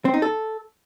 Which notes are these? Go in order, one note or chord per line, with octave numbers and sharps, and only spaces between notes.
C4
D#4
A4